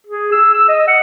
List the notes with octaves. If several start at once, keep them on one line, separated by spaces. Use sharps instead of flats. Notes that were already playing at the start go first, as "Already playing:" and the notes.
G#4
E6
E6
D#5
F#5